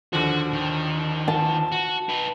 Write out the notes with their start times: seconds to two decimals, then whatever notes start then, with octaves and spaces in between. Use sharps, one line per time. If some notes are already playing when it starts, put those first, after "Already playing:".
0.13 D#2 D3 F3 F#4
0.53 D#3
1.28 A5
1.72 F#4
2.09 D#4 B4